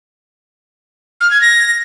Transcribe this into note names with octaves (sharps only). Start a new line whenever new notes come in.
F6
G#6
A#6